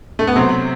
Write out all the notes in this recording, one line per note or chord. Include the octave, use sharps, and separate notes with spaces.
A3
B3
C3 F#3 C4